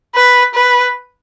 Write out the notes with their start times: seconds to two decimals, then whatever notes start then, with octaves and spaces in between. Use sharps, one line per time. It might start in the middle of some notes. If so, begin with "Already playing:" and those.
0.15 B4
0.54 B4